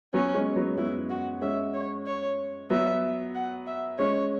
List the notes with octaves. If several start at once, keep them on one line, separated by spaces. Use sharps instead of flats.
F#3 B3 C#4
G#3 C#4
F#3 B3
F#3 B3 E4
F#4
G#3 C#4 E5
C#5
C#5
F#3 B3 E5
F#5
E5
G#3 C#4 C#5